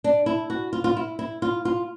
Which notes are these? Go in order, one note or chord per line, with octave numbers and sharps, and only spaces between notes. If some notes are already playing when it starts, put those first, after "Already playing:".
D4
E4
F#4
F4
F4
E4
E4
F4
F4